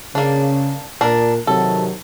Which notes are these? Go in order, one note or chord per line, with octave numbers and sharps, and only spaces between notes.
C#3 A#3 D4
A#2 D4 A#4
C3 D#3 F#3 A4